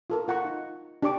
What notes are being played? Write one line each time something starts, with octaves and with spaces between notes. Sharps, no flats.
F4 A4 A#4
F4 F#5 A#5 C#6
D#4
D4 G4 D5 C#6 D6